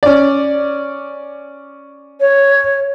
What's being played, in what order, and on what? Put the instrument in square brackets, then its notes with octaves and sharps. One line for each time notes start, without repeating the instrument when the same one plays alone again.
[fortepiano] C#4 D5
[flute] C#5